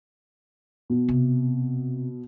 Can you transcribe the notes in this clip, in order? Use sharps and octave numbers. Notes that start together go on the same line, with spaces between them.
B2
C3